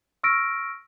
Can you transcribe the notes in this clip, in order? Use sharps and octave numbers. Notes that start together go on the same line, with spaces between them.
C#6 E6 F6 A#6 D7